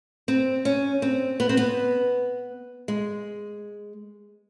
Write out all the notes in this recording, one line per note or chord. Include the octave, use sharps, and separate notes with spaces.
C4
C#4
C4
B3
C4
B3
G#3